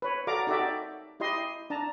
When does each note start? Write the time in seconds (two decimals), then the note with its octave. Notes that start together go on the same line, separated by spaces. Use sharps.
0.02 B4 C#5
0.27 F#4 A4 D5 F5 A#5 D6
0.47 D#4 F#4 G4 A4 D5 E5
1.20 E4 G4 D#5 C6
1.70 D4 A5 A#5